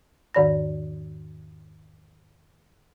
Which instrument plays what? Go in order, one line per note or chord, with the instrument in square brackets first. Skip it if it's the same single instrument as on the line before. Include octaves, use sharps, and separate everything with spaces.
[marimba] E2 G#2 D#3 D5 B5 A#6